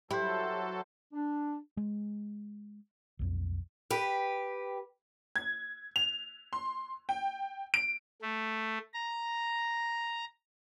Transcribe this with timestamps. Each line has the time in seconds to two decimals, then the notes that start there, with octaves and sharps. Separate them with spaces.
0.11 F#3 E4 G4 A4 B4 C5
1.12 D4
1.77 G#3
3.19 B1 F2
3.90 G4 B4
5.36 G#6
5.96 F7
6.53 C6
7.09 G5
7.74 D7
8.22 A3
8.93 A#5